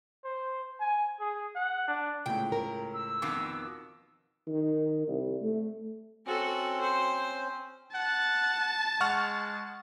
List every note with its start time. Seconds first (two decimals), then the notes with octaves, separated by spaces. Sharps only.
0.24 C5
0.80 G#5
1.20 G#4
1.55 F#5
1.88 D4
2.26 C#2 A2 G5
2.52 A#4
2.94 E6
3.22 F2 B2 D#3 D6
4.47 D#3
5.08 C2
5.42 A3
6.27 C4 C#4 F#4 A4
6.82 C5
7.95 F#5 A5
9.01 G#3 F#5 C#6 F6